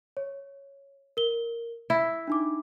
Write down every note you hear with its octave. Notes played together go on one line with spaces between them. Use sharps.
C#5
A#4 G7
E4 E5
D4 D#4 D6